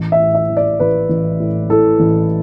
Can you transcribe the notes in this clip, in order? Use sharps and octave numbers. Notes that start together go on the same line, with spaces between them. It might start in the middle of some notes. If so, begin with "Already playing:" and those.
Already playing: A1
E5
A2
E5
E3
D5
A1 B4
A1
A2
E3 A4
A1